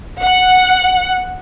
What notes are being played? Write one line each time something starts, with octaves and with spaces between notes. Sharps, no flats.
F#5